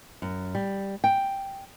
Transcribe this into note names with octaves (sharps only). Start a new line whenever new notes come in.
F#2
G3
G5